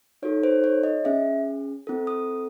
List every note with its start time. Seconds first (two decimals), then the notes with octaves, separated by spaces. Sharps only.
0.22 D#4 F#4 A4 C#5
0.43 C5
0.64 C#5
0.83 D#5
1.04 C#4 G#4 E5
1.87 C4 E4 A4
2.07 D#6